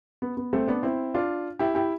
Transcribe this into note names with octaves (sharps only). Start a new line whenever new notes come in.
B3
B3
A3 C4
B3 D4
C4 E4
D4 F4
E4 G4
E4 G4